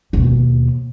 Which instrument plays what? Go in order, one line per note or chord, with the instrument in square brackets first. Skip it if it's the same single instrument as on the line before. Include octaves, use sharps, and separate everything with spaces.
[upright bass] D#2 B2